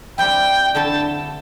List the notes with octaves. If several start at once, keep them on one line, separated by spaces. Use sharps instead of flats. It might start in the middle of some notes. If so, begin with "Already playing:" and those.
G3 C4 E4 G5
D3 A3 E4 A4 A5